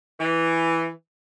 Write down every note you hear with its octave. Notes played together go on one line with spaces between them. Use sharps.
E3